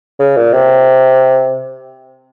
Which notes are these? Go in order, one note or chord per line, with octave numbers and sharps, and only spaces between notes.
C#3
A#2
C3